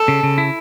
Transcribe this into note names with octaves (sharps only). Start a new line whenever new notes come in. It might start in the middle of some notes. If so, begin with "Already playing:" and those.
Already playing: A4
C#3
C#3
E4